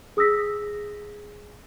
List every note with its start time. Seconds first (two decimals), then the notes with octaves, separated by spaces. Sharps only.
0.17 G#4 D#6 E6 A#6 B6